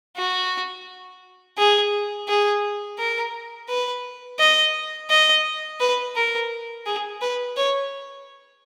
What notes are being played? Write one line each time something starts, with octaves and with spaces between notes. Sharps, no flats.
F#4
G#4
G#4
A#4
B4
D#5
D#5
B4
A#4
G#4
B4
C#5